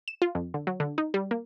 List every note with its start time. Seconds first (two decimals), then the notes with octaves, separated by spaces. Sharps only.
0.08 E7
0.22 F4
0.35 F2
0.54 D3
0.67 F#3
0.80 D3
0.98 D#4
1.14 G3
1.31 A#3